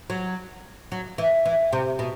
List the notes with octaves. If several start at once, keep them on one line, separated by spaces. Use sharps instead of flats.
F#3
F#3
E3
E3
C3
B2